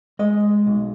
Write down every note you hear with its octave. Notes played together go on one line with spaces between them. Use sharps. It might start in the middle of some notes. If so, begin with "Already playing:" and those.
G#3 D#5
B1